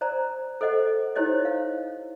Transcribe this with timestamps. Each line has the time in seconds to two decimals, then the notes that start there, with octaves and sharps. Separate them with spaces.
0.01 C5 D5 A#5
0.61 A4 C5 D#5 F#5
1.16 D#4 E4 G4 C5 C#5 D#5
1.45 F5